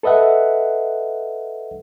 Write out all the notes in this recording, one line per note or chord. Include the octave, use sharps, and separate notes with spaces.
A4 B4 D#5 E5 F#5